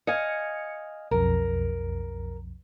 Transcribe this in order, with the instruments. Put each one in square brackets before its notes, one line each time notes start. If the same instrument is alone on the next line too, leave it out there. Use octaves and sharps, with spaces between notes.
[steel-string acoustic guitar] D#5 F5 G#5 [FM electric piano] C#7
[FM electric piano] B1 F2 [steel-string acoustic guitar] A#4